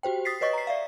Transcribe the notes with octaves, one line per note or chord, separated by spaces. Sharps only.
F#4 G4 C5 G5
D#6 A6 B6 C7
B4 C#5 D#5 C#6 A6 B6
A#5 C7
D5 E5 F5